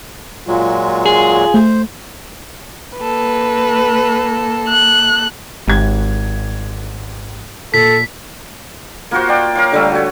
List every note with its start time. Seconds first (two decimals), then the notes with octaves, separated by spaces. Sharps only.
0.48 A#2 F#3 G#3 F4
1.06 G#4
1.54 A3 C5
2.97 A#3 A4 B4
4.68 F#6
5.68 G#1 G#2 G4 G#6
7.74 A#2 A4 B6
9.11 A#3 F4 F#4 C5
9.29 D5 G5
9.55 A#4 C#5 F5
9.72 D3 G3 A3
9.92 F#4 C#5